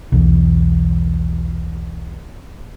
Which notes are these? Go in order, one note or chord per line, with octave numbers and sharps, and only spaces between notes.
B1 E2